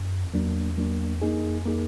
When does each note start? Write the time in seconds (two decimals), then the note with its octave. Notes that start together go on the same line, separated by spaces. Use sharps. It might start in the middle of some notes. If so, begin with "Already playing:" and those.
Already playing: F#2
0.24 F2
0.34 E2 F#3 A#3 D4
0.77 F#3 A#3 D4
1.22 F2 A#3 D#4 G#4
1.66 A#3 D#4 G#4